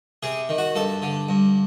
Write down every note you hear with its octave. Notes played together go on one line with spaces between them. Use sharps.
C3 G#4
D#3
F#4
G2 A4
D3
G2